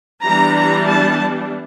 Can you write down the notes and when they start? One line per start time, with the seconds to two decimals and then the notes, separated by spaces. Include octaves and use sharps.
0.24 E3 G3 B3 D4 A#5
0.56 A#5
0.87 A5